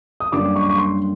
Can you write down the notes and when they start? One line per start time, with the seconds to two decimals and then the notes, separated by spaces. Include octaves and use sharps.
0.20 D#6
0.32 F#2 D3 G3 A#3 D6
0.56 C#6
0.63 D6
0.69 C#6
0.78 C6